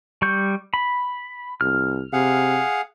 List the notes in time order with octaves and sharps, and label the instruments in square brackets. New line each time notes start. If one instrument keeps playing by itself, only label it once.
[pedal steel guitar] G3 C#6 G6
B5
[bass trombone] C2 [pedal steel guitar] F6
[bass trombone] C3 [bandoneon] G#4 F5 F#5